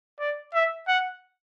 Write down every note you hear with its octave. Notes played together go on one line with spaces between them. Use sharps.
D5
E5
F#5